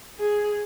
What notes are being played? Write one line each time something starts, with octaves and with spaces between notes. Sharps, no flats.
G#4